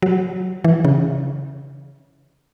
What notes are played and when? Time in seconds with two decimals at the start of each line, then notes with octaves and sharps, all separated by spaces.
0.02 F#3
0.64 E3
0.85 C#3